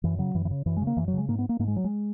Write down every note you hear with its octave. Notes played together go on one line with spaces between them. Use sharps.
F#2 E3
C#3 F#3
F#2 E3
E3
C#3
F#2 E3
C#3 G#3
A#3
F#2 E3
F#3
C#3
G#3
G#2 A#3
B3
A#3
G#2 A#3
G#3
F#3
G#3